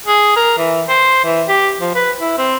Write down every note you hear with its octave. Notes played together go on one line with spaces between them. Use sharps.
G#4
A#4
E3
C5
E3
G4
F3
B4
E4
C4